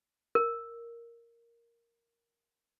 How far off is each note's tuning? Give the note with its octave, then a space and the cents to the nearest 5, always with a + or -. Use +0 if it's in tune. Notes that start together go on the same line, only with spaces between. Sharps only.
A#4 +0